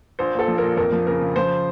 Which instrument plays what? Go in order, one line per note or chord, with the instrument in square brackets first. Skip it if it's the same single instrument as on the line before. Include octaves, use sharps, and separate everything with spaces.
[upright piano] A#1 C5
A#2 A4
F3
A#2 A#4
F2 A#4
F3
C#3 A#4
C#3
F3 C5